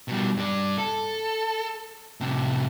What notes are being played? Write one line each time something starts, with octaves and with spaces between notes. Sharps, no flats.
B2 G3
G2 D5
A4
A2 C3